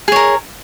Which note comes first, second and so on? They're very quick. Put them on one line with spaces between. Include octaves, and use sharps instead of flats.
G#4 C#5 A#4